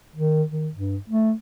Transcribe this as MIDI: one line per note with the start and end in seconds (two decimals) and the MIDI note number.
0.16 0.43 51
0.50 0.68 51
0.74 0.97 43
1.10 1.33 57